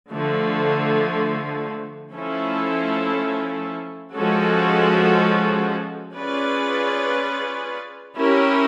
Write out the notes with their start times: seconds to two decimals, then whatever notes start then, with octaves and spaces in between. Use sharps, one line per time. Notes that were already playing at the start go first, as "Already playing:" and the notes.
0.10 D3 F3 A3
2.12 F3 A3 C#4 E4 A4
4.13 F3 G#3 C#4 F#4 A4
6.15 C#4 F4 G#4 B4 D5
8.17 C#4 E4 G4 A#4